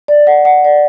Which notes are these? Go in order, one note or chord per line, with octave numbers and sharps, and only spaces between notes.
D5
F#5
F#5
D5